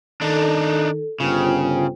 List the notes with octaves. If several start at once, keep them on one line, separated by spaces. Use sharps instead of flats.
D#3 D4 D#4 A4
G1 C#3 F4 C5 G5